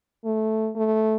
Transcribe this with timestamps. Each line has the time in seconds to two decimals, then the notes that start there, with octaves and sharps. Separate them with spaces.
0.25 A3
0.76 A3